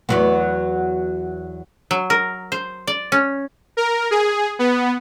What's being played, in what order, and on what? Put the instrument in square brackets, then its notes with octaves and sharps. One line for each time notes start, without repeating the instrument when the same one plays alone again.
[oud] E2 F#3 B3
[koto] F#3
A#4
C5
D5
C#4
[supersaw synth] A#4
G#4
B3